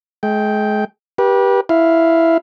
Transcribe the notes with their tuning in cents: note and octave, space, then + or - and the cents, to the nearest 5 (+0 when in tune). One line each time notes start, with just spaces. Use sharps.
G#3 +35 G5 +0
G4 +0 B4 -35
E4 +0 F5 +0